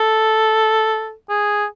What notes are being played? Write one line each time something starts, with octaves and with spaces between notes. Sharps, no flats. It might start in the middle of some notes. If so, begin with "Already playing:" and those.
Already playing: A4
G#4